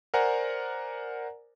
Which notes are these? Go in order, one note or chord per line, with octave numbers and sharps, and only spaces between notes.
A#4 C5 D5 F#5 G#5 A#5